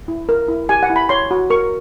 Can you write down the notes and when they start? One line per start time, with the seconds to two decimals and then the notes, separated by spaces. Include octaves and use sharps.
0.08 E4
0.29 A#4
0.48 E4
0.69 G4 G#5
0.83 F#5
0.90 E4
0.96 B5
1.09 C#5 C6
1.31 F#4
1.50 A#4 C#6